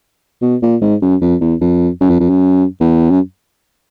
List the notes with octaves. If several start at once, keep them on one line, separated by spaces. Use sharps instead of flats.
B2
A#2
G#2
F#2
F2
E2
F2
F#2
F2
F2
F#2
E2
F#2